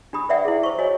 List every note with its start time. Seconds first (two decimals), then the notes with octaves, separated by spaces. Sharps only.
0.13 D4 G4 B5 D#6
0.29 B4 D5 E5 F#5 G5
0.45 E4 G#4
0.63 C5 C#6
0.78 F#4 C#5 D#5 G#5